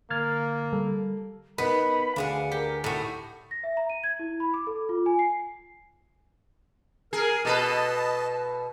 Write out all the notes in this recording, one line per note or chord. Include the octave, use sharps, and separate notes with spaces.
D3 A#3 F6 G#6 A6
G3 A4
B3 D#4 A#4 B4 B5
D2 D4 G#4 F5 F#5
G4 A#4
A2 D#4 F#4 C#6
A#6
E5
A#5
D#7
G#6
E4
B5
D6
A4
F4
G#5
C7
G#4 A#4
B2 A4 B4 D#5 A5